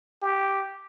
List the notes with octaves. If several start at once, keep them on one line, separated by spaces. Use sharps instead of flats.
G4